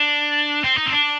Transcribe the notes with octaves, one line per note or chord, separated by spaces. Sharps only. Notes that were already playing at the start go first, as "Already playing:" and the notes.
Already playing: D4
C4
D#4
C4
D4